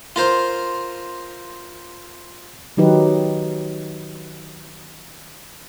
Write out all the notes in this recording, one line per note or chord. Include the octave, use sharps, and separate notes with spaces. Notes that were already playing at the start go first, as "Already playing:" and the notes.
F4 A#4 C5
D#3 F#3 D#4 G4 B4